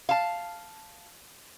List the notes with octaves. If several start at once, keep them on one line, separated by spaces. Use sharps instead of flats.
F5 A5